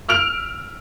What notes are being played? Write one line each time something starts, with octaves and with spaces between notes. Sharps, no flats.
E6 F6 D7 F7